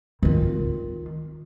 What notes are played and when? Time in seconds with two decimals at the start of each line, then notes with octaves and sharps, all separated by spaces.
0.23 D#3 F4